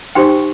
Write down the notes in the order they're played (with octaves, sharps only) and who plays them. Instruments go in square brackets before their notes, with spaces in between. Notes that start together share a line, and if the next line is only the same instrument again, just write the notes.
[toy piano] D#4 G4 C5 G5 C6